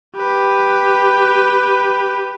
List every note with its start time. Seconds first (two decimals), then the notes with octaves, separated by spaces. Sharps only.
0.17 G4 B4